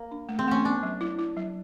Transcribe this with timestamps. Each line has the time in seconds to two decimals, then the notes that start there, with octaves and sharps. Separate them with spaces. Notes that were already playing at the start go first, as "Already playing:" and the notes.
Already playing: A#3
0.11 D4
0.29 A3
0.39 C4
0.47 A3 C#4
0.65 B3 D4
0.83 F#3
1.01 E4
1.18 E4
1.37 F#3